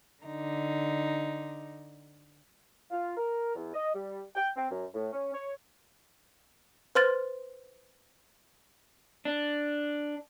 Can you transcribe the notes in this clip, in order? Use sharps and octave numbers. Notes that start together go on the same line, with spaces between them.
D3 D#4
F4
A#4
E2
D#5
G3
G5
C4
F#2
A2
C#4
C#5
B4 C5 C6 F6 A6
D4